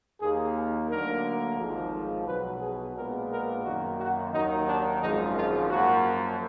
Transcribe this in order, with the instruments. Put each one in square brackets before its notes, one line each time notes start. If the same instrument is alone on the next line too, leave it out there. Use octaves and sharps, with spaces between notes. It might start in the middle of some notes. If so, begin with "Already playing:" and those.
[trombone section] D#2 D#3 A#3 G#4
D2 D3 F#3 A#3 A#4
G#1 G#2 F3
B1 B2 F#3 B4
G#4
A#1 A#2 G#3 B3 A#4
A#4
F#2 D#3 A#3 F#4
F#4
D#2 D#3 F#3 D#4
D4
G#1 F#2 F3 G#3 D#4
F4
F#2 F3 A#3 F#4